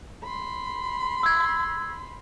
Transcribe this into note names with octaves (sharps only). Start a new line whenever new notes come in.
B5 C6
E6 G#6